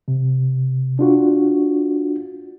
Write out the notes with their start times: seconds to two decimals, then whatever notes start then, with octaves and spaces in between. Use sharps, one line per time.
0.08 C3
0.99 D4 F4 F#4